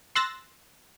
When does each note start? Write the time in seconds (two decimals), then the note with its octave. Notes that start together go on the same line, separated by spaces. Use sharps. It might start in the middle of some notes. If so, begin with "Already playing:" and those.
0.15 C6 E6 F#6 A6 A#6